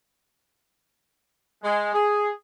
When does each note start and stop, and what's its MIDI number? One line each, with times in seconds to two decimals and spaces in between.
1.64 1.93 56
1.94 2.30 68